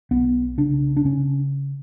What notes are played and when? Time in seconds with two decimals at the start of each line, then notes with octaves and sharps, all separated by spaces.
0.11 B1 B3
0.58 C#3 D4
0.97 D4
1.04 C#3 C#4